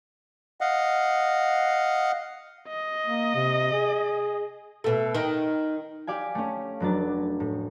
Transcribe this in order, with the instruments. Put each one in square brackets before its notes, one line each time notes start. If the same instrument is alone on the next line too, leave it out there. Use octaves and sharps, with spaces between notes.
[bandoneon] D#5 F5 F#5
[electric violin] D#5
[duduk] A#3
C3
G#4
[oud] B2 A3
D#3
[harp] G4 D5 F5 G#5
A3 C#4
F1 F#3 D4 A6
A2